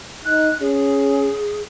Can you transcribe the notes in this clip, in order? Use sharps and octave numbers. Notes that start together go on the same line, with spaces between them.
D#4 F#6
C#4 G#4